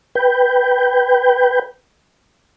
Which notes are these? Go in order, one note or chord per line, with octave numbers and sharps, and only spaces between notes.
B4 G5